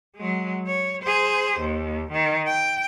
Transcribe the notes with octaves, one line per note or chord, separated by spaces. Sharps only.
F#3 G#3
C#5
G#4 C5
D#2
D#3
G5